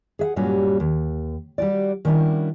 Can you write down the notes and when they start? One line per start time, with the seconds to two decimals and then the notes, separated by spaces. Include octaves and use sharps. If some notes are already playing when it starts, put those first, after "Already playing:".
0.19 G#4 E5 F#5
0.36 G2 A#2 F#3 G3 C#4 F#4
0.80 D#2
1.58 G3 F#4 D5
2.05 D#3 G3 C#4 D4 E4 F#4